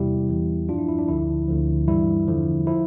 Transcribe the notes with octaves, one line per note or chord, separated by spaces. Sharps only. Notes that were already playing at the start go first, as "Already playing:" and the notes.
Already playing: E2 C3 G3 E4 G4
E2 E3 G3
G2 F3 D4 F4
E4
E4
D4
D2 D3 F3 E4
D2 D3 F3
G2 E3 G3 E4
E2 D3 F3
F3 E4